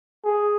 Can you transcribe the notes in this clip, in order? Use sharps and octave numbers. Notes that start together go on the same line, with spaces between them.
G#4